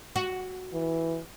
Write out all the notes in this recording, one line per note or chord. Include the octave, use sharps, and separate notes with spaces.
F#4
E3